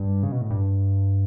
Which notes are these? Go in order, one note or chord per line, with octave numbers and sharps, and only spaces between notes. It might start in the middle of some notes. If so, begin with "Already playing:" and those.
Already playing: G2
C#3
B2
A2
G2